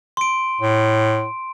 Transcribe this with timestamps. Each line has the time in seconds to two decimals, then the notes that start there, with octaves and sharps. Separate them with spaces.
0.17 C6 D7
0.61 A2